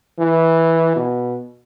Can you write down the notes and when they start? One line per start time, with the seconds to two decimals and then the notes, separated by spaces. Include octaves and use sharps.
0.19 E3
0.96 B2